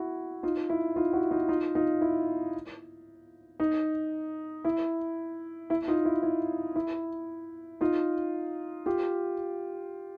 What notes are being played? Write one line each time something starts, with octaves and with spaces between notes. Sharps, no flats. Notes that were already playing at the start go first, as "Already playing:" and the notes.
Already playing: E4 F#4
D#4 F4
E4
D#4 F4
E4 F#4
D#4 F4
D#4 F4
D#4 F4
E4
D#4
E4
E4
D#4 F4
E4
E4
E4
D#4 F4
F4 G4